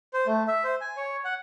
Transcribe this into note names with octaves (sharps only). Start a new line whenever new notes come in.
C5
A3
E5
C5
G#5
C#5
F#5